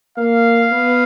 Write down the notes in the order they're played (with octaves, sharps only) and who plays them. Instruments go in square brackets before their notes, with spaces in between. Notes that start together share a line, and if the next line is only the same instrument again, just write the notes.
[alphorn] A#3 [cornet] F5
[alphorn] B3